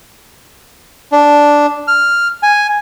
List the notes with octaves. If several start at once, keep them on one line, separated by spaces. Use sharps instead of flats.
D4
F6
G#5